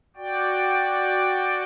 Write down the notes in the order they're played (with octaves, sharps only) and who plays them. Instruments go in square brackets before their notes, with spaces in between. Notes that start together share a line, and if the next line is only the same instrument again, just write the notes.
[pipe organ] F#4 D5 G5